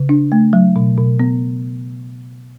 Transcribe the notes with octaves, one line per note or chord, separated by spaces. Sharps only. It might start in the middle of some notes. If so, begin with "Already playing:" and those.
Already playing: C#3
D4
A3
F#3
B2
B2
B3